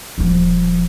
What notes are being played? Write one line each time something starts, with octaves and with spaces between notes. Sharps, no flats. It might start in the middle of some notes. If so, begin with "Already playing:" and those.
D#1 F3